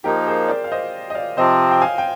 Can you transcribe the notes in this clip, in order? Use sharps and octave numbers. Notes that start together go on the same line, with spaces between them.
F3 A#3 D#4 G4 A#4
G#4 C5
A#4 D5
F5
C5 D#5
D#5
D5 F5
C3 F3 C4 C5 D#5
G5
F5 G#5
G5